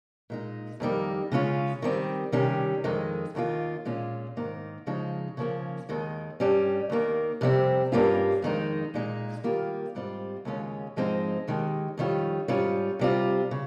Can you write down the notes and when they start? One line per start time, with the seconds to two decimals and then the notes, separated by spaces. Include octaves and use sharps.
0.30 A#2 G#3 D#4
0.80 F2 D#3 G3 A#3 D#4
1.32 C#3 G#3 C#4 F4
1.82 D#3 G3 C4
2.32 C3 D#3 G3 C#4
2.84 F2 D#3 G#3
3.35 D#2 D#3 A#3 F4
3.85 A#2 G#3 C#4 F4
4.37 G#2 D#3 A#3
4.87 C#3 F3 G#3 D#4
5.37 C#3 F3 A#3 C#4
5.89 D#2 D#3 G#3
6.40 G2 G3 C#4
6.90 D#2 D#3 A#3
7.41 F2 C3 G3 C4
7.92 G2 G3 A#3 C#4 F4
8.42 F2 D#3 G#3 D#4
8.94 A#2 G#3 D#4
9.44 D#3 G3 A#3 F4
9.95 G#2 G3 C4 F4
10.45 D#2 C#3 G#3 C#4 F4
10.96 G#2 F3 G#3 C4 D#4
11.48 D#2 D#3 G#3
11.98 F2 D#3 G3 C#4 F4
12.48 G#2 G3 C#4 F4
12.99 C3 G3 C4 F4
13.51 C#3